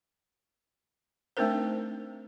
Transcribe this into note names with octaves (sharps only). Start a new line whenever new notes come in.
A3 C4 D4 D#4 A#4 C5